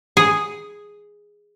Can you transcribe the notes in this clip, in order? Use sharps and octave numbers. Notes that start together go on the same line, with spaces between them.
G#4